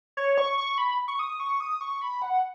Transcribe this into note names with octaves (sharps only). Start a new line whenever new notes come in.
C#5
C#6
C#6
B5
C#6
D#6
C#6
D#6
C#6
B5
F#5